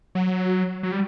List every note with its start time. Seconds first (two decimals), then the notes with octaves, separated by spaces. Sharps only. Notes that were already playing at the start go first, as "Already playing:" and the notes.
0.15 F#3
0.83 F#3
0.92 G3